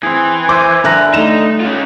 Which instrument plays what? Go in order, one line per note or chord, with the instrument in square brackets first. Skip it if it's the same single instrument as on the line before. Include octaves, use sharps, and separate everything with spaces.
[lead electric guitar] E3 [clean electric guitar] C4 G#4
[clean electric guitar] C5 E5 G#5 [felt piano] D6
[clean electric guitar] D3 G3 A#5 [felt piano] E5 G#5 F#6
[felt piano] A3 E7 [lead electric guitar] D#4
[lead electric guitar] C#4 F4